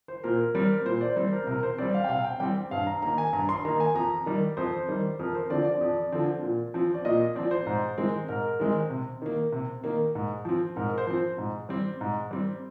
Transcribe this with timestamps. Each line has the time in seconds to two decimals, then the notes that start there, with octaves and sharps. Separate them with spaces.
0.08 C5
0.23 A#2 A#4
0.55 G3 C4 A#4
0.85 A#2 C5
1.01 D5
1.16 G3 C4 C5
1.32 A#4
1.47 C3 A#4
1.63 C5
1.78 G3 C4 D5
1.94 F5
2.04 G5
2.09 C3 F5
2.24 G5
2.40 G3 C4 G5
2.71 G2 F5
2.87 A#5
3.02 D#3 A#3 A#5
3.18 G#5
3.33 G2 A#5
3.49 C6
3.65 D#3 A#3 A#5
3.80 G#5
3.95 F2 A#5
4.26 D#3 G3
4.57 F2 C5
4.88 D#3 G3
5.19 F2 A#4
5.35 C5
5.50 D3 F3 C4 D5
5.65 D5
5.81 F2
6.12 D3 F3 C4
6.43 A#2
6.74 F3 C4
6.94 D5
7.05 A#2 D#5
7.35 F3 C4 D5
7.51 C5
7.66 G#2
7.98 D#3 G#3 C4
8.28 G#2 A#4
8.60 D#3 G#3 C4
8.90 C3
9.22 D#3 A#3
9.52 C3
9.84 D#3 A#3
10.15 G#2
10.45 F3 C4
10.76 G#2 A#4
10.98 C5
11.07 F3 C4
11.38 G#2
11.69 G3 C4
12.01 G#2
12.31 G3 C4